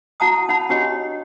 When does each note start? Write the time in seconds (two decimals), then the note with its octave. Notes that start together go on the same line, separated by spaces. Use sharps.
0.20 E4 F#4 F#5 A5 A#5 D#6
0.49 D#4 F#5 A5 B5
0.70 D4 F#4 G4 C#5 D#5 B5